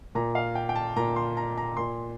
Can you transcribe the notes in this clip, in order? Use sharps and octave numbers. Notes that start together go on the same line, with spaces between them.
A#2 A#5
F5
G5
G5
A5
A#2 A#5
C6
A#5
A#5
A#2 C6